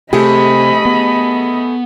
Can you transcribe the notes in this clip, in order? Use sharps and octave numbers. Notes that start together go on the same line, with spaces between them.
C3 A3 G4 G#4 D#5 B5
B3